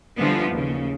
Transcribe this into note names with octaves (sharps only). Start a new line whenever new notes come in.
D3 E3 F3 G3 B3
D#2 C#3